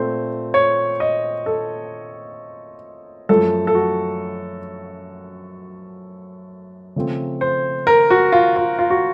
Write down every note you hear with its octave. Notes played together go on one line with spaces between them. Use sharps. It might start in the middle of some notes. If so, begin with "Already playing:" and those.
Already playing: A#2 A3 C4 C5
C#5
D#5
A4
F#2 F3 A3 A4
A4
F#4
C#3 F3 A3 C4
C5
A#4
F#4
F4
F4
F4
F#4